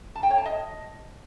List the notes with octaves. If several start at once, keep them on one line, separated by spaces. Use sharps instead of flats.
A5
G5
C#5
A5
D#5